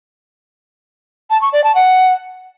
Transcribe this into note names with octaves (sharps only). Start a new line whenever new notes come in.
A5
C#6
D5
A5
F#5